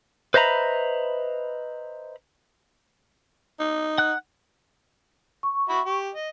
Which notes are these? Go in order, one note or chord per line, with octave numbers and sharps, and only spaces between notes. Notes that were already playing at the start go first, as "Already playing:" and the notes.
B4 C5 D#5 E5 A#5 B5
D#4
F#5 F#6
C#6
F#4 E5 B5
G4
D#5